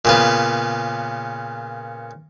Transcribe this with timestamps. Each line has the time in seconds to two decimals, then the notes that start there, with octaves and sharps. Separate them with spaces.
0.05 A#2 C#3 B3